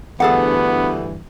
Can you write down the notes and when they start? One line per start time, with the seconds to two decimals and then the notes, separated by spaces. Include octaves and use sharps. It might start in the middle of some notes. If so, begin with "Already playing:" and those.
0.20 D2 G2 E3 B3 G#4 A4 F#5